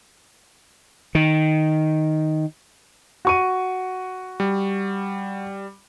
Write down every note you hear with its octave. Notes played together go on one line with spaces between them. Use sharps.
D#3
F#4 C#6 D#7
G3